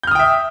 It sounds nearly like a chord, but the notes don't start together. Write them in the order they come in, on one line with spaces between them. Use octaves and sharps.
G6 F6 D#6 G5 E5